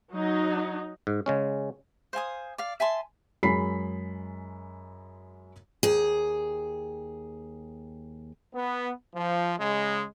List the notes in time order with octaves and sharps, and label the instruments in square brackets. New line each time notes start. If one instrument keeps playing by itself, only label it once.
[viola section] F#3 D#4
[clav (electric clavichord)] G#2
C#3 G#3 C#4
[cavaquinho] C5 F5 G#5 D#6
D5 F5
E5 G#5 A5 C6
[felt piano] F#2 G#3 B5 B6 C7
[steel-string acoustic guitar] D#2 G#4
[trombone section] B3
F3
C#3 G#3